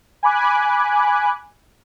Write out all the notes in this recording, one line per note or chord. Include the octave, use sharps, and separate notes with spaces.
G#5 B5 D6 F#6